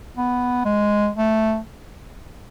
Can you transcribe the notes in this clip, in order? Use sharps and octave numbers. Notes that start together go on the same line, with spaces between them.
B3
G#3
A3